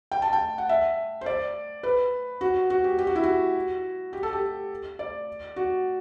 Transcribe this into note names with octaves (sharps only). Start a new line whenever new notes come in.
G5
A5
G5
F#5
E5
C5
D5
B4
F#4
F#4
G4
G4
F#4
E4
F#4
G4
A4
G4
D5
F#4